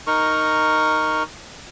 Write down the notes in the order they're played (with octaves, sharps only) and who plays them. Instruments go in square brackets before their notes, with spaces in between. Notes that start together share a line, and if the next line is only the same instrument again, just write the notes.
[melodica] D#4 A#4 C#6